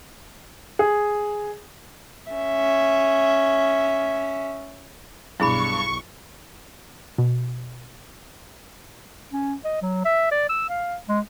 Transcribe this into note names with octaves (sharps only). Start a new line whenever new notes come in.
G#4
C#4 E5
B1 G2 E4 G#4 B5 C#6
B2
C#4
D#5
F#3
E5
D5
E6
F5
G#3